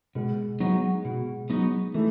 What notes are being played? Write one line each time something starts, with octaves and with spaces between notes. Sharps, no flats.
B2 G#3
F#3 B3 D#4
B2
F#3 B3 D#4
E3 A3